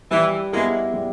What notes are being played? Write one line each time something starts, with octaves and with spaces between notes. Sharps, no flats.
E3 G3
G#3 A#3 B3 E4 G#4
G3